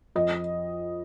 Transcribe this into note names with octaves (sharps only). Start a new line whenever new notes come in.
F2 D#5